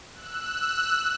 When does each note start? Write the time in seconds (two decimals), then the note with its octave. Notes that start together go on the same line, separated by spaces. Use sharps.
0.13 E6 F#6